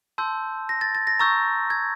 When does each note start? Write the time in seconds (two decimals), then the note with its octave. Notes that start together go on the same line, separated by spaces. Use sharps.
0.18 A5 C6 E6 G6
0.69 A#6
0.81 A6
0.95 A6
1.07 A#6
1.19 A#5 C#6 E6 G6 A6
1.70 G#6